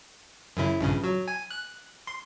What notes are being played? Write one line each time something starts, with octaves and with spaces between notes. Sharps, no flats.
F#2 C#3 E4
A#1 G2 C#3
F#3
G#5
F#6
C6